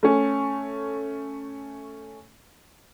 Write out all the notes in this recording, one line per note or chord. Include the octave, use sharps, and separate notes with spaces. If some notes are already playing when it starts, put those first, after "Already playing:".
A3 C#4